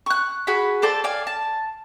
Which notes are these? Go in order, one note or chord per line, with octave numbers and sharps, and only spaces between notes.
C#6 F#6
F#4 G#4 B5
A4 C5 D5 A5
D5 F5 G#5
A5